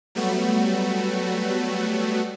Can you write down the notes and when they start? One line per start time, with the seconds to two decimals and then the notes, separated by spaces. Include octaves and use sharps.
0.15 F#3 G3 A3 B3 F#4